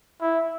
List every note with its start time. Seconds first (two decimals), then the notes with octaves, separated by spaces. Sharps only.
0.21 E4